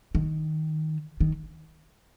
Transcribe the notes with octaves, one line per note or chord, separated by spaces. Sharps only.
D#3
D#3